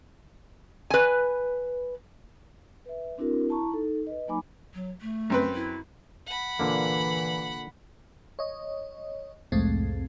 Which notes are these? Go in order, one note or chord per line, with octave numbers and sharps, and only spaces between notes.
B4 G#5
B4 E5
C4 D4 E4 F#4 A#4
E4 A5 A#5 C#6
D#4 A4
B4 D#5
F#3 A#3 D#4 G#5 B5 D6
F#3
A3
F#2 C4 B4
E4
F#5 B5
A#2 D3 E3 A#3
C#5 D#5
C2 F2 A2 G#3 A3 C4